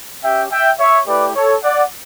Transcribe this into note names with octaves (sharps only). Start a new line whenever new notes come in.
C#4 G4 E5 G5
E5 G5
C#5 E5
A3 E4 G4 B4 D5
A4 C#5
D5 F#5